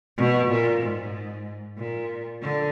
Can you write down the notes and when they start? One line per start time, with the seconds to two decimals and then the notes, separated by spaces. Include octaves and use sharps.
0.17 B2
0.50 A#2
0.81 G#2
1.78 A#2
2.42 D3